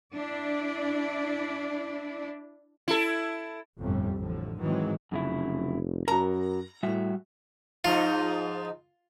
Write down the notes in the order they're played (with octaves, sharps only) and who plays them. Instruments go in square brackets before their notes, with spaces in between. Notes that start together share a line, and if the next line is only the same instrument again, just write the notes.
[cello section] D4 E4 D5
[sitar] E4 A4
[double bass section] G1 F2 A2 C3 G3
A1 A2 D3 F3
G#2 D#3 E3 F#3 G#3 C4
[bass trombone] F1 [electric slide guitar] F#2 C#3 E4
[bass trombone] F#2 [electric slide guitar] F#4 A#4 [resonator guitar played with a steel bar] A#5
[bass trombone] A2 [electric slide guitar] G3 F#4 E5
[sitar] G#2 F3 D#4 [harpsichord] F4